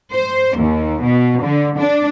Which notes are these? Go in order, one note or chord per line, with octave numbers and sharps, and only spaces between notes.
C5
D#2
B2
D3
D4